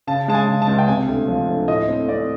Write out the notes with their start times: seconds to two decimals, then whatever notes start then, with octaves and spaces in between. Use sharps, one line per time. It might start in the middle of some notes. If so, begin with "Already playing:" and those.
0.07 C#3 A5
0.28 G#3 A5
0.34 G#5
0.48 C#3
0.62 A5
0.68 C#2
0.78 G5
0.88 C3 G#5
1.09 D2
1.28 F3
1.49 D2
1.68 A2 D#5
1.88 C4
2.08 C4 D5